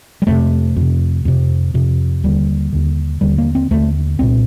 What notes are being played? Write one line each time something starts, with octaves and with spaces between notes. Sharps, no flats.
G3
F2 C3 A3
F2 C3
F2 C3
F2 C3
D#2 D3 G3
D#2 D3
D#2 D3 G3
A#3
C4
D#2 D3 A3
C2 A#2 C4